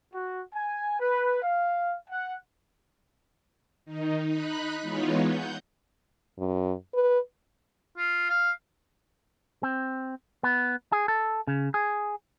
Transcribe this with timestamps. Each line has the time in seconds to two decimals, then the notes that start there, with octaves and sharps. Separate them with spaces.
0.13 F#4
0.53 G#5
1.00 B4
1.42 F5
2.09 F#5
3.85 D#3 D#4
4.26 D#4 B5 F#6
4.81 E3 G#3 B3 D#4 F4 C#5
5.26 F#5 G6
6.39 F#2
6.94 B4
7.97 F4
8.30 F5
9.63 C4
10.43 B3
10.92 G#4
11.08 A4
11.47 C#3
11.74 G#4